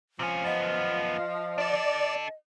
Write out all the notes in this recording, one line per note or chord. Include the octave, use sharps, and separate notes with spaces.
C3 F3 C#4
F#2 B3 D#5
D4 A4 D5